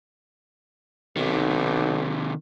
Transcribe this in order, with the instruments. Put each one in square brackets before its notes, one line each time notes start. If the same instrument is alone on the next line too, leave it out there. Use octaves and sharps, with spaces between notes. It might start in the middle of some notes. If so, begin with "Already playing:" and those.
[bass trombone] B1 [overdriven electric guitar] C3 D#3